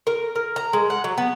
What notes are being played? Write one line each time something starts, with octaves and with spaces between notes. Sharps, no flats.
A#4
A#4
A#5
G#3
F#5
F#3
B3